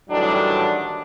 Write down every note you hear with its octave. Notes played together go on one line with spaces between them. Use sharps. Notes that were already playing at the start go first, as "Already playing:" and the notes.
A2 D#3 E3 F#3 G3 D4